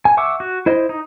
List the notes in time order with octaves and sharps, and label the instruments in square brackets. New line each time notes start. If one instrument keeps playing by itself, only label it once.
[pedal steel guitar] G#5
E5 F#5 C#6 D6 E6
F#4
E4 C5 D#5
D#4